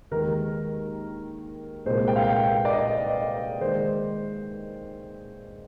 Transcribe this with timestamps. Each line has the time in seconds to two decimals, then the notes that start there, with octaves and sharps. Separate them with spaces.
0.11 D#2 D#3 G#3 A#4
1.86 C2 A#2 G#3 C5
2.08 G5
2.16 F5
2.24 G5
2.65 D5
2.73 D#5
3.60 D#3 G#3 C5